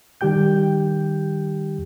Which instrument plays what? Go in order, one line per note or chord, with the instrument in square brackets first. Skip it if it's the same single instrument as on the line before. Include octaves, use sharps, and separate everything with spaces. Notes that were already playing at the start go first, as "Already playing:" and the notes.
[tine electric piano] D#3 G3 G4 G5 G6